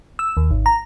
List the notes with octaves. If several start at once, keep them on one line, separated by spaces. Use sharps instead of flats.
E6
D#2
G#1
A#5